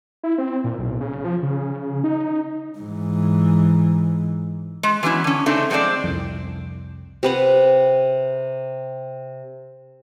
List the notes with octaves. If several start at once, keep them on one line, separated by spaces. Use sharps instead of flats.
E4
C4
A#2
B1
C#3
F3
C#3
D#4
G#2 E3
G#3
E3 F#3 B3 C#4 E4
D3 C#4
C#3 A3 C4 D4 D#4
F3 G#3 C4 G#4 C5 D5
C2 F2
C3 B4 F#5